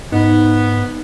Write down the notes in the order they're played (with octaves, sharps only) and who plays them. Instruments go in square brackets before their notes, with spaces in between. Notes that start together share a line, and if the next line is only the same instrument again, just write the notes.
[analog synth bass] G#2 [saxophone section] B3 [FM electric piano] D#4